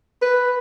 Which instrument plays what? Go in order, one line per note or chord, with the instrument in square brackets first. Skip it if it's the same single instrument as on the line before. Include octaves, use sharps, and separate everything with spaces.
[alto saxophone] B4